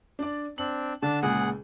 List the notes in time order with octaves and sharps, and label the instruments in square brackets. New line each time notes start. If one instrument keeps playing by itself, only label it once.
[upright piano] D4 D5
[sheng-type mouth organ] C4 D4 [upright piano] F#7
[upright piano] D3 [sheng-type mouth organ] D4 A5
[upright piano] C#2 A#2 [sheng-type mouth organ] G#4 F#5